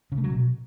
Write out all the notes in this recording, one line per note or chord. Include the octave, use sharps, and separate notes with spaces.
C#3
A3
F#3
B2